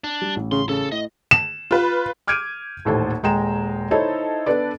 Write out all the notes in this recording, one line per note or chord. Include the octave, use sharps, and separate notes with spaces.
D4
G3
A1
C#3 C6
C#3 A4
A2 D#5
E7
F4 B4
D6 F6 G6 G#6 D7 D#7
D#1 A1 D#2 A4 C5 A5
D#1 G#3 G5 A#5 E7
D#4 E4 A4 C5 C#5 D#5
B3 D4 A4 B4 D5